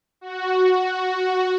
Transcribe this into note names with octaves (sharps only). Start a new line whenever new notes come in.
F#4